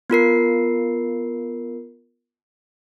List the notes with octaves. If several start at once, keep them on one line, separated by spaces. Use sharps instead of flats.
B3 F4 A#4 C7